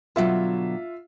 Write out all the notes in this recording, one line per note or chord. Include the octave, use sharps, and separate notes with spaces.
B2 D3 F#3 F4 E5